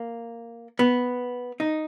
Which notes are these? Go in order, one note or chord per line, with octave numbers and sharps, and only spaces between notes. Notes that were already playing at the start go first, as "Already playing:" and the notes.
Already playing: A#3
B3
D#4